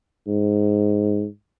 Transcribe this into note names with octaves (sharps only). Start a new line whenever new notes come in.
G#2